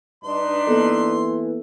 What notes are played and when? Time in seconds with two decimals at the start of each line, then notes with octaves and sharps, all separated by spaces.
0.24 G2 D4 D#4 B4 C6
0.67 E3 A#3 B3 A4